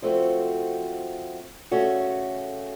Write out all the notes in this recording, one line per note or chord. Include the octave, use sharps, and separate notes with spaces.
F3 A3 C4 F#4
C#3 A3 C#4 F#4